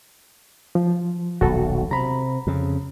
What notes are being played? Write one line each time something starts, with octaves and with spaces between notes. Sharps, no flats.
F3
D#1 B1 F#4 A4
C3 A#5 B5
F2 C#3